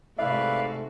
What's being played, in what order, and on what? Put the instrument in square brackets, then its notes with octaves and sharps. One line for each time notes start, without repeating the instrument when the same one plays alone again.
[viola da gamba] G#2 C3 F#4 [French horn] A3 [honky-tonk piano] E4 [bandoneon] B4 D5 F5